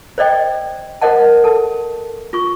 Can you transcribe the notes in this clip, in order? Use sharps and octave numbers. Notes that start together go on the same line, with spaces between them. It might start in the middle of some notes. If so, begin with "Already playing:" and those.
C5 D5 D#5 G5
A#4 C5 D#5 F#5 A5
A4 A5
F4 C#6